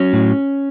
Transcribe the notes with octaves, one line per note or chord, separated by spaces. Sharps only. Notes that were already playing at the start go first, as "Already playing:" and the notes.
Already playing: F#3 C#4
A2